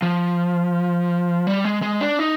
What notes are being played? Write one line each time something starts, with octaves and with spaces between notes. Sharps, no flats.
F3
G3
G#3
G#3
D4
D#4